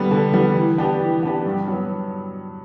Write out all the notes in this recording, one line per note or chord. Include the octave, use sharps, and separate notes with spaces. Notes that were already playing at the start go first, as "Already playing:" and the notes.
Already playing: D3 G3 B3
D3
G3 B3
E3
B3 D4 G4
E3
B3 D4 G4
G2
F#3 B3